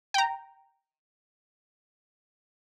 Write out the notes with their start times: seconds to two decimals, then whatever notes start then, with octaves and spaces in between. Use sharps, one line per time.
0.14 G5 A#5